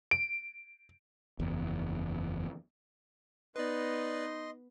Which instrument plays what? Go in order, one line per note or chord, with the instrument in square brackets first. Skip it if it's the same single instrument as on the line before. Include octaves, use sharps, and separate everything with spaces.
[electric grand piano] D7
[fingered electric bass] F#1 E2
[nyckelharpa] B3 [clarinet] D#4 [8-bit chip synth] B4 D5 [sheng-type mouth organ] D#5 C6